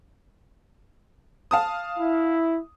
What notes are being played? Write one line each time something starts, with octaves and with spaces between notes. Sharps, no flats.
F5 A5 D#6
E4